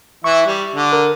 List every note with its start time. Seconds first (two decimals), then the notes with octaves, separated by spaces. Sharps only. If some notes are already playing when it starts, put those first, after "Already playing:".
0.24 E3 E4 E5 C#6
0.46 G3
0.75 D3 D5
0.93 A#4